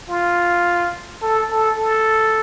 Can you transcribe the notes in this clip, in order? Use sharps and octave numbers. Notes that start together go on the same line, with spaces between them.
F4
A4
A4
A4